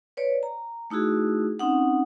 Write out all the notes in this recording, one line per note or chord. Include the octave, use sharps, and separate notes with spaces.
B4 C#5 D5
A#5
A3 D#4 E4 F#4 G#4
C4 C#4 D#4 F#5